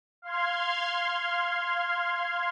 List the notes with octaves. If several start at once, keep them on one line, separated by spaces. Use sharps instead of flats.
F5 C6 F6 G#6